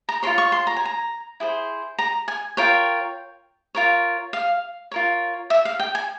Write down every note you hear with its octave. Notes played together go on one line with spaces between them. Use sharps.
A#5
F4 A#4 C#5 C6
C#6
C6
A#5
G#5
A#5
E4 G#4 C5
A#5
G#5
F4 A#4 C#5 G5
F4 A#4 C#5
F5
F4 A#4 C#5
E5
F5
G5
G#5